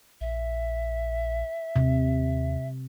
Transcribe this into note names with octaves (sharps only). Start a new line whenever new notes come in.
A#1 E5
D#2 C3